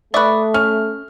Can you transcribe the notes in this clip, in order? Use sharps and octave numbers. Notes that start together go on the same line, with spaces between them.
A3 B4 D5 E5 C#6 D#6
C#4 F6